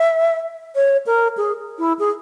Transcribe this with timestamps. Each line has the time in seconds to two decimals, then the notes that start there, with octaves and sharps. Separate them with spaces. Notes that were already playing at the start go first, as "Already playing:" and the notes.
Already playing: E5
0.75 C#5
1.06 A#4
1.37 G#4
1.79 E4
1.99 G#4